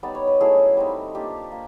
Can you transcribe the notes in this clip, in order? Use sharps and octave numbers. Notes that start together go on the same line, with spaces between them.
G3 B3 D#4 D5
C#5
B4
F#3 A3 C#4 E4 G#4
G3 C4 D#4
A#3 D4 F4 G4
A#3